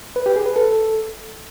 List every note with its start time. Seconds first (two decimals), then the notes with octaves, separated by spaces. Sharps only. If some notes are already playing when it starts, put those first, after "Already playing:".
0.16 B4
0.26 G4
0.36 G#4
0.46 B4
0.56 A4